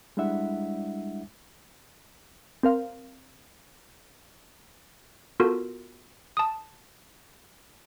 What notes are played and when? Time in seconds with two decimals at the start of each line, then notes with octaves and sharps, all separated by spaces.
0.17 G3 G#3 D4 E4 E5 F#5
2.63 C4 A#4 F5
5.40 B3 F4 F#4 A4 A#4
6.37 A5 D#6